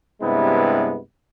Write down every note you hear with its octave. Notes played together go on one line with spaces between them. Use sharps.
G2 C3 G#3 B3 E4